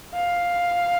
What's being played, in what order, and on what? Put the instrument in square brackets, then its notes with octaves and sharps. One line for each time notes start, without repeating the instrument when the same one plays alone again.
[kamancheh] F5